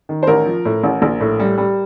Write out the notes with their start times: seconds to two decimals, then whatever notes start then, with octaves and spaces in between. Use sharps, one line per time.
0.09 D#3
0.23 C5
0.27 A1 A#4
0.46 F3
0.65 A2
0.84 A1
1.02 A#1
1.20 A2
1.40 G3
1.58 G3